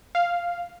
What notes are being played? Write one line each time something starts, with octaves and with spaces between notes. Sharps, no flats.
F5